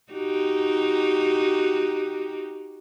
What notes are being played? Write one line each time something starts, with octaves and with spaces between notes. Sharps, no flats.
D#4 F#4 G4